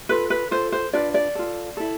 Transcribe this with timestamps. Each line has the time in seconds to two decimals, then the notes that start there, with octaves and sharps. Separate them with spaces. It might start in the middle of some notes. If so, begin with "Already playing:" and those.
0.09 F4 A4 B4
0.30 B4
0.51 F4 A4 C5
0.72 C5
0.93 D4 F4 B4 D5
1.14 D5
1.35 F4 A4
1.77 E4 A4